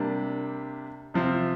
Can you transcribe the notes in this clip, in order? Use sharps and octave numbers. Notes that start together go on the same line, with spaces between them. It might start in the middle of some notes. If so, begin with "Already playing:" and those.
Already playing: C3 G3 A#3 D4
C3 F3 C4